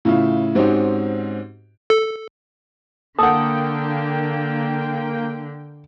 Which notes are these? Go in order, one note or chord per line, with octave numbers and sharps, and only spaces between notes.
A2 C#3 E4 F4
G#2 C4 C#4 D#4 F#4 G4
A4
D3 A#3 A4 F#5 G5 D#6